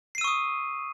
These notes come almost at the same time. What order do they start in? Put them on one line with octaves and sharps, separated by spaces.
C7 D#7 E6 C#6 D#6